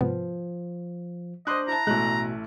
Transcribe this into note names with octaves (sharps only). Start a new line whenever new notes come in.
G#2 C3 F3 B3
D4 C5 D#5 C6 D6 F#6
E4 A5 A#5
A1 B2 G#3 A3 F#6